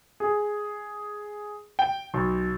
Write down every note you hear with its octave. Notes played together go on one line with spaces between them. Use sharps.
G#4
G5
B1